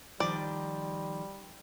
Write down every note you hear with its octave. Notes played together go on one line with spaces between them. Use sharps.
D#3 F3 G3 D5